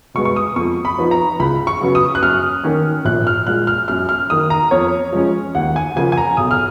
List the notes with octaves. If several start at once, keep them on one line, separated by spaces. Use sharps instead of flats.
B2 G#3 B3 C#6
C#6
D#6
F2 C#6
B5
F3 B3 D#4
A#5
C#2 B5
C#6
C#3 F#3 B3
D#6
F#6
F#2 F6
D#3 A#3 C#4
A#1 F#6
F6
A#2 G#3 F#6
F6
F#2 F6
F6
D#3 A#3 D#6
A#5
F2 C#5
F3 G#3 C#4
D#2 F#5
G#5
C#3 F3 A#3 C#4 G#5
G#5
A#5
B1 D#6
F6